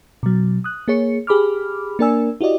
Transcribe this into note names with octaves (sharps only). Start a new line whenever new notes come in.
B2 F#3
D#6 F#6
A#3 G#4 C#5 C#7
G4 G#4 B5 D6 F6
A#3 D4 A#4 D5 G#5 E6
E4 F#4 G4 D5 D#5